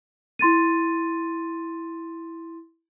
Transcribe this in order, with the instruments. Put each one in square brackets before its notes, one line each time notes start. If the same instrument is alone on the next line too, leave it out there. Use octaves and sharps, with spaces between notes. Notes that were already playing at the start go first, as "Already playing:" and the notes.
[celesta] E4 C6 A6 D#7